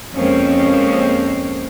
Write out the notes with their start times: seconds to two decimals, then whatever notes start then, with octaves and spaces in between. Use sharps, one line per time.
0.14 F2 F3 G#3 A#3 C4 C#4